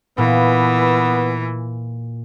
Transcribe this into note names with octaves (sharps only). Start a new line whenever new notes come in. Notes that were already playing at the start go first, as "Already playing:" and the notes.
A#2 E3 B3